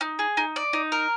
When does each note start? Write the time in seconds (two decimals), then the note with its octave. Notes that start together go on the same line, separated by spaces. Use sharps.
0.01 D#4
0.19 G#4
0.37 D#4
0.56 D5
0.73 D#4
0.92 A#4